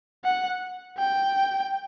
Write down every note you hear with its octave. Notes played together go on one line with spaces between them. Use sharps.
F#5
G5